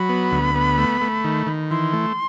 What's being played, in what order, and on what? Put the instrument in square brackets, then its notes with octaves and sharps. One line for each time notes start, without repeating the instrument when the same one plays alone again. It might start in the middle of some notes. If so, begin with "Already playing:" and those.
Already playing: [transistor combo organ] F#3 [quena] B5
[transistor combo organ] B3
D2
B3
A3
A3
D#3
D#3
[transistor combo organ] E3 [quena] C6
[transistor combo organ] A3